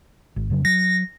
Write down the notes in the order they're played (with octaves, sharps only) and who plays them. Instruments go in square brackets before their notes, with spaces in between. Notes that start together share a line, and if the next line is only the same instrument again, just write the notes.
[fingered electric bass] G#1
F2 C#3 F#3
[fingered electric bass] F#3 [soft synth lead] A#6